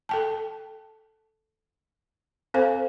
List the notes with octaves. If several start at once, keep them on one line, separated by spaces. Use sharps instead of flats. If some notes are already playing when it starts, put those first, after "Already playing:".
A4 G5 A5
C4 A4 C5 F5 G#5